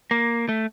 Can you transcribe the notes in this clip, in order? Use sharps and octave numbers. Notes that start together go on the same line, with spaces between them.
A#3
A3